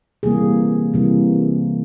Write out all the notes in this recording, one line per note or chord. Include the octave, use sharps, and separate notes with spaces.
C3 E3 G3 A#3 G#4
C3 E3 G3 A#3